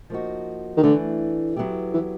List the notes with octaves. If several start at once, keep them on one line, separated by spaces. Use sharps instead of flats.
F3 A#3 D#4 F#4
D#3
D3 E3 A3 D4
F#3 B3 E4 G4
E3